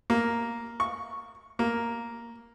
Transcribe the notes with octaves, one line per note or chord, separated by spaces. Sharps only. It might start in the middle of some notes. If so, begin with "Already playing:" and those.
A#3
C#6
A#3